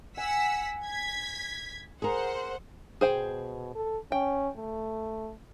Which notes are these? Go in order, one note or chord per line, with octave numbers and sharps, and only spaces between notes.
F#5 G#5 E6 B6
G#6 B6
G#4 A#4 C5 F#5
B2 G#4 C5 G5
A4
C#4 G5
A3